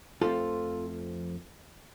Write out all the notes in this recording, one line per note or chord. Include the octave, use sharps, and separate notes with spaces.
F2 F3 A3 C4 F4 A4